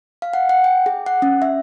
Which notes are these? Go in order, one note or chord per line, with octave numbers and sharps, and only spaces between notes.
F5
F#5
F#5
G5
G#4
F#5
C#4
E5